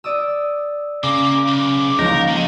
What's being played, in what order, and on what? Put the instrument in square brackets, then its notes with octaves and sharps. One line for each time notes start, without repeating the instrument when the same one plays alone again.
[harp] D5 D#6 E6
[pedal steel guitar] C#3 [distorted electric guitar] A#3 [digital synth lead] D6
[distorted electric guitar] B1
[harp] C#2 F3 A#3 [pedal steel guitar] D#4 [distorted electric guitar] A#4
[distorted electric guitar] D3